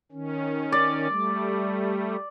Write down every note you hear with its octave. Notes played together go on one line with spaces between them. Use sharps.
D#3 C#4
D5
G3 A3